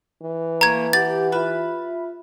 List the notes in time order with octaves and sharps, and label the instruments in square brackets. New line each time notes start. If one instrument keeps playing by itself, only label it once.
[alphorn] E3
[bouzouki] A3 A#3 [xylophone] A#5 G#6
[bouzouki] G4 [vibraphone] F#5 [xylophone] A6
[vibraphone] F4 E5 [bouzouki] B4